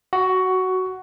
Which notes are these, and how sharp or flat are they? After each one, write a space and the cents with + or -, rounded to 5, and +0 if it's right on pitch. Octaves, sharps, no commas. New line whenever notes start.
F#4 +10